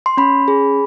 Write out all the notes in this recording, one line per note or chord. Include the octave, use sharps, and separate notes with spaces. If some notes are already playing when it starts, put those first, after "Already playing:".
C6
C#4 B5
G#4